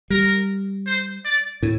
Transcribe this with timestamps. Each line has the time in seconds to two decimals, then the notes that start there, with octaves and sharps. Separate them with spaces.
0.10 G3 A#4
0.87 C5
1.25 D5
1.63 A2